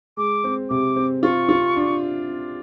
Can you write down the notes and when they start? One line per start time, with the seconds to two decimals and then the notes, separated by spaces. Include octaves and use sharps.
0.17 G#3 D6
0.44 C4
0.70 C3 D6
0.96 C4
1.23 F4 C#6
1.49 F4
1.76 D4